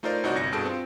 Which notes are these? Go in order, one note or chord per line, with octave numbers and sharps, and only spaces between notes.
A3 D#4 F4 A#4 C5 D5
C2 D#4 F#4 C#5 D5 G6
G1 C2 A#6 C#7
G2 B2 G#4 A4 A5 D7
C4 F4